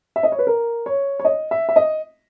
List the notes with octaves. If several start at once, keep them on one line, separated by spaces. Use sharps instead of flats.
E5
D#5
C#5
B4
A#4
C#5
C#5
D#5
E5
E5
D#5